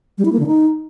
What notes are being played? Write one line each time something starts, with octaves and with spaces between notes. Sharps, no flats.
G3
E4
A#3
D3
D#4